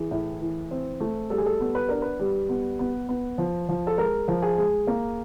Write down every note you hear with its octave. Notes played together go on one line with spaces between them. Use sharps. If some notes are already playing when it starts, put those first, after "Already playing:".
Already playing: E3 G#4
A2
E3
C4
A3
G3 A4
G#4
A4
B3
B4
D4 A#4
B4
G3
B3
B3
B3
F3
F3
A4
G#3 A#4
F3
G#4
G#3
A#3